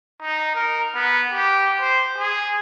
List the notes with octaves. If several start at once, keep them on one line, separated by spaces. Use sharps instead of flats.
D#4
A#4
B3
G4
C5
G#4